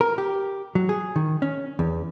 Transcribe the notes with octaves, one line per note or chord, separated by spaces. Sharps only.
A#4
G4
F#3
G#4
D#3
C#4
E2